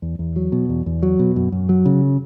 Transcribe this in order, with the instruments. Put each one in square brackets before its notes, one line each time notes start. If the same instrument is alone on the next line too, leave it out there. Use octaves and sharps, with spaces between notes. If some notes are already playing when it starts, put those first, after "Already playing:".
[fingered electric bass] E2
E2
F#3
B2
E2
E2
F#3
B2
F#2
F#2
F#3
C#3